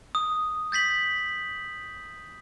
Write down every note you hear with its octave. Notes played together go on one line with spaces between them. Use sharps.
D#6
G6 A6 B6 F#7